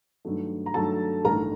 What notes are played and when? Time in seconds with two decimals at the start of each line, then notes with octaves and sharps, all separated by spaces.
0.25 G2 D#3 F#3 A3
0.66 A#5
0.74 G2 D#3 F#3 A3 A4 A5
1.25 A1 G2 D#3 A3 A#4 A#5